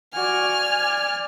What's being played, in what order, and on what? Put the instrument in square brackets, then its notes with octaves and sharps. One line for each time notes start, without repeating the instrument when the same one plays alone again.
[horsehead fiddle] F#4 D5 [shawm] G#5 [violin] F6
[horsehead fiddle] D5